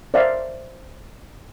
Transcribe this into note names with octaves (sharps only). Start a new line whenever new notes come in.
C5 D5 E5 F5